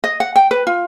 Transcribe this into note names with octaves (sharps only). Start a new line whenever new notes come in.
D#5
F#5
G5
B4
F4